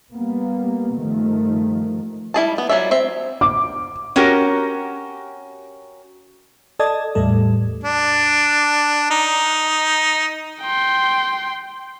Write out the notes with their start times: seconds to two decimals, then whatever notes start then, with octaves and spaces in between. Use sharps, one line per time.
0.11 G3 A#3 B3
0.96 G2 D#3 F3 A3
2.34 G3 E4 G#4 A5
2.58 B3
2.69 F#3 G3 F4 D5 E5
2.91 C4 E5
3.41 D6
4.16 C#4 F#4 G4 A#4
6.79 A4 D5 D#5 A5 D#6 G#6
7.15 E2 A2 G3 A4
7.83 D4
9.11 D#4
10.62 G5 C6